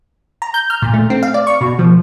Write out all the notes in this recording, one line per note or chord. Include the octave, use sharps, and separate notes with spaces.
A#5
G6
F6
A#2
A3
C4
F5
D5
C#6
B2
F3